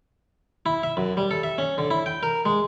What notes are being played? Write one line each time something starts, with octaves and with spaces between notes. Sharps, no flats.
E4
E5
F#2
G3
A4
E5
C#4
D3
E4
G5
A#4
G#3